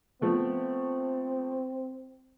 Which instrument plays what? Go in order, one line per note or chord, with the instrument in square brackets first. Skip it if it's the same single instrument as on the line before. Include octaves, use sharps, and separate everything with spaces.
[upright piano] F3 A3 B3 [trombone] C4